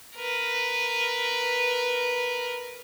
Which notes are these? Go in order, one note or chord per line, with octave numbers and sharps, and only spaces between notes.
A#4 B4